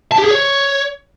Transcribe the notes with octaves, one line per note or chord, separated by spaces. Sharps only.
A5
G4
G#4
C#5